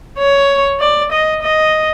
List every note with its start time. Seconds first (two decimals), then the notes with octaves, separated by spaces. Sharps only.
0.18 C#5
0.80 D5
1.12 D#5
1.42 D#5